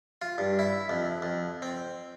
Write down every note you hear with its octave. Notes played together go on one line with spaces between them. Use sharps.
F4
G2
E4
F2
F2
C4